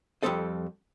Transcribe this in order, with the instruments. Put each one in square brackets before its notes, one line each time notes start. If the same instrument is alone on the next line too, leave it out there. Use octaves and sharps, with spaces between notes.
[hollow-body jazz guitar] F2 G#2 G3 C4 A4 D#5